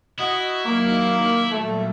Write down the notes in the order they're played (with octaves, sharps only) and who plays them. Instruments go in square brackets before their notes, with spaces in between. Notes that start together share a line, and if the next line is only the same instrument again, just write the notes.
[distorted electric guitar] E4 [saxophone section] F#4 D#5
[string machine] D#3 F#3 D#4 [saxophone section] A#3
[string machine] A#2 F#3 G3 [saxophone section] A3